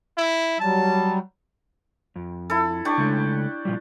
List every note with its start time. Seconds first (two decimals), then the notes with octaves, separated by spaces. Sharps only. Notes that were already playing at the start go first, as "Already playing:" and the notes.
0.18 E4
0.60 F#3 G3 A5
2.16 F2
2.50 E4 A4
2.85 D4 G4 C#6
2.98 C#3 G#3 A3
3.65 A#2 F3 G3